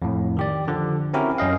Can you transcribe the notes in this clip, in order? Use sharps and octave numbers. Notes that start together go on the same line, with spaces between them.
F2 A2
D#3 G4 D5
D3 F3
C4 C#4 E4 F#4 G4 A#4
F#2 C#4 D#5 F5